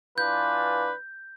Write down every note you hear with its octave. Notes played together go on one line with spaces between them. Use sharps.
E3 D4 F4 B4 G6